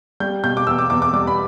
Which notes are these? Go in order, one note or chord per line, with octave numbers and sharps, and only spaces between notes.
G3 G6
B2 G6
D6
E2 E6
D6
E2 D6
D6
G3 D6
B5